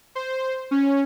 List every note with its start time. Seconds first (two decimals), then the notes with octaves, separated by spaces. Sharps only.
0.15 C5
0.71 C#4